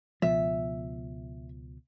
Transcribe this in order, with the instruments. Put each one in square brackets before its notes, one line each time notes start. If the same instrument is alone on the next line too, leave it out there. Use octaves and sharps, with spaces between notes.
[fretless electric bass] C#2 B2 F3 [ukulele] E5